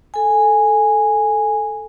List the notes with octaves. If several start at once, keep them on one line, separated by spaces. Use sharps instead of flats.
A4 G#5